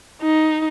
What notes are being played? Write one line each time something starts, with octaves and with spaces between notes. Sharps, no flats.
D#4